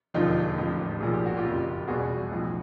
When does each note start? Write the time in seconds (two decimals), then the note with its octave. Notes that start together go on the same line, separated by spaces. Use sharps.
0.14 E1 D#2 D3 F3 D#4 F4
0.58 A1 A2 F3
1.01 B1 A#2 F3 G#4
1.13 G4
1.26 F#4
1.37 F4 G4
1.44 F#1 F2 C#3
1.88 E2 B2 G3 F#4 G#4
2.31 B1 A2 F3